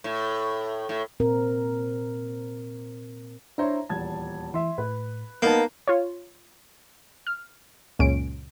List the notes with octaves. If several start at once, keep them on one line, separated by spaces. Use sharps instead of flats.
A2
A2
A#2 C4 A#4
D4 E4 C5 C#5 A#5
D#1 E2 A5 G#6
E3 E5 C6
A2 B4
A#3 B3 D#4 A5 G6
F4 C#5
F6
C#2 F#2 A#2 C#4 D7